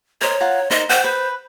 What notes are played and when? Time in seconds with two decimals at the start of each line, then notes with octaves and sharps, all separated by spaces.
0.21 A#4 C5 C#5 D#5
0.41 F4 F#5 A#5
0.70 D#4 A#4 C5 D#5
0.89 C5 F#5 G5
1.04 B4